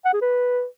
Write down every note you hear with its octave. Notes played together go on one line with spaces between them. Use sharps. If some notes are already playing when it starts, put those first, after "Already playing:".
F#5
G#4
B4